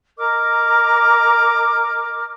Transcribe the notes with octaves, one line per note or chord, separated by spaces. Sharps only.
A#4 D#5 D6 F6